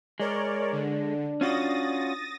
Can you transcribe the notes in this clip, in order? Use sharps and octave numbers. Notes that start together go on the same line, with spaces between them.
G#3 A#4 C#5 D5
D3 D4
C#4 F4 F#4 D#6 A6 A#6